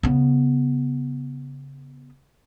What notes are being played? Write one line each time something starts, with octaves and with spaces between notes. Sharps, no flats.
C#3 B3